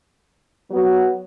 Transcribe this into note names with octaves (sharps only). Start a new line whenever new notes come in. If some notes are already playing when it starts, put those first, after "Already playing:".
F#3 B3 F#4